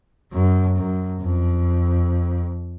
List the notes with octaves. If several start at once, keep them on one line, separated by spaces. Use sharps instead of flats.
F#2
F#2
F2